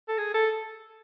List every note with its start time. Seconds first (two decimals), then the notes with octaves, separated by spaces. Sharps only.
0.08 A4
0.18 G#4
0.34 A4